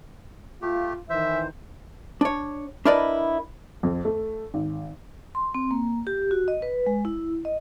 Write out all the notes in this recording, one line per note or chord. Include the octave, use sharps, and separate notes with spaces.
A3 F4 G4
D#3 E3 C5 E5
D4 C#5
D4 E4 A#4 B4 D5 D#5
F2
A3
G#1
C6
C4
A#3
G4
F#4
D#5
B4
G#3
E4
D#5